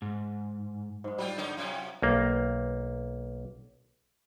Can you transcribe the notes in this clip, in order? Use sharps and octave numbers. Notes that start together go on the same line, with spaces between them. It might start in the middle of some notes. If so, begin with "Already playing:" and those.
G#2
G#2 G#3
F#3 G3 F4 G4
D3 D#4 C#5
F#2 C3 C#4 F4
B1 A#3